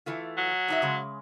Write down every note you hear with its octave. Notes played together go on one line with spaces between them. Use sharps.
E3 A3 F4
F#3
D4 D#4 E5
C#3 G#3